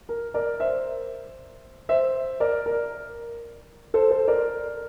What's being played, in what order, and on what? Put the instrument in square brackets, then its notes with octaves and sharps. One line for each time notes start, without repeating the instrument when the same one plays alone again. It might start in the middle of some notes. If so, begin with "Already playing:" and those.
[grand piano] A#4
A#4 D5
C5 E5
C5 E5
A#4 D5
A#4
A4 C5
A4 C5
A#4 D5